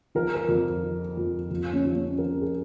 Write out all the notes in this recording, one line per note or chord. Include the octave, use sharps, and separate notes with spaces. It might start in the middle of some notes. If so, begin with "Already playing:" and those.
F3 A#4
A#4
F2
F3
F2
F2
C#4
F3
C#4
F3 A#4
G#4